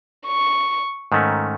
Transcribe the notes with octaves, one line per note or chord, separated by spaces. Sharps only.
C#6
G#2 D#3 A3 C#4